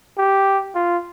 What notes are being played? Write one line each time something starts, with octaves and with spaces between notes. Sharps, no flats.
G4
F4